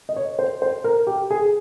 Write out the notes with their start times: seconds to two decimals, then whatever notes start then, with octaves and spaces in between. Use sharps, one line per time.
0.09 D#5
0.16 C#5
0.39 C5
0.62 C5
0.84 A#4
1.07 G4
1.30 G#4